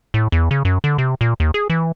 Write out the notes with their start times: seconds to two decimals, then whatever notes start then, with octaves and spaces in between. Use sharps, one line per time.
0.14 A2
0.32 E2
0.51 C#3
0.65 F#2
0.84 D3
0.98 C3
1.21 A#2
1.40 D#2
1.54 G#4
1.70 E3